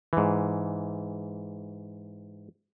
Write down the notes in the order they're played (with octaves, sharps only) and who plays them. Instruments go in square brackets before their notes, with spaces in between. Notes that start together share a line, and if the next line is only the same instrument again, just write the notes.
[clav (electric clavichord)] G#2 E3